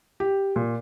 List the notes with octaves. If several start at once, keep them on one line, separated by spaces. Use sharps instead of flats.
G4
A#2